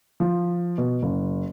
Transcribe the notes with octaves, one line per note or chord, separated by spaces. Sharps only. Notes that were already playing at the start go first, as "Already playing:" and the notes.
F3
B2
F#1